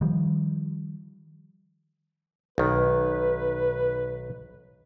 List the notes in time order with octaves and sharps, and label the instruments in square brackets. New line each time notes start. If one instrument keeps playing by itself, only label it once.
[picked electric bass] D#3 F3 G3
[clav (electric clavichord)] B1 D#3 [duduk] B4